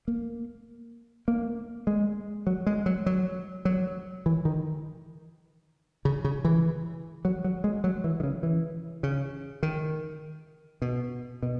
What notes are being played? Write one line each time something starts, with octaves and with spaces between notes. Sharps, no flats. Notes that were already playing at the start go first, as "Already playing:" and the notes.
A#3
A#3
G#3
F#3
G#3
F#3
F#3
F#3
E3
D#3
C#3
C#3
E3
F#3
F#3
G#3
F#3
E3
D#3
C#3
E3
C#3
D#3
B2
B2